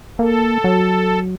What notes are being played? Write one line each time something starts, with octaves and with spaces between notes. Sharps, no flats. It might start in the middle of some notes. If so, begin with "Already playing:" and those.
A#3 A4
F#3